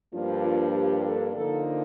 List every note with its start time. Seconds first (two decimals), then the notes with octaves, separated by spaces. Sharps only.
0.13 G2 F3 A#3 D4 F4
0.45 F4
0.75 G4
1.05 A4
1.35 D3 F3 A#3 D#4 A4